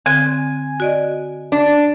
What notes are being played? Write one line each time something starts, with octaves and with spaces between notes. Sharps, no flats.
D3 C4 G#5 F#6
F#4 D5 D#5
D4
A6